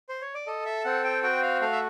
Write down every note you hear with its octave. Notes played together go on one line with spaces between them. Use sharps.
C5
C#5
D5
A4 D#5
E5
C4 F#5
G5
F#4 G5
F5
A3 F5
E5